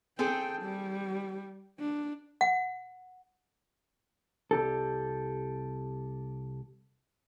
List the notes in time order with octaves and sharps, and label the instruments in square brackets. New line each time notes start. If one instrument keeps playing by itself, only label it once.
[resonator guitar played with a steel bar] C4 G#4 A4 [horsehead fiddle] G5
[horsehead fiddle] G3
D4
[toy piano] F#5
[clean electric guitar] C2 G4 A4